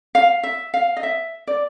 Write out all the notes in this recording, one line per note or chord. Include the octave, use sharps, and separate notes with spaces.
F5
E5
F5
D#5
E5
D5